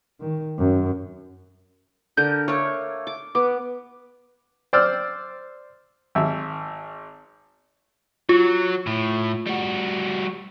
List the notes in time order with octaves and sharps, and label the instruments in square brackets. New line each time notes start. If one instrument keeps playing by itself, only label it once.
[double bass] D#3
F#2
[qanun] D3 A#4 [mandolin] G6
[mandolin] A3 A#3 [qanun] C#5
[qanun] D6
[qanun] B3 [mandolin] D6
[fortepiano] C5 D5 E6 F6
G#1 E5
[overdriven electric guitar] F#3 [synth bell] F4
[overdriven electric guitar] A2
G3 F#4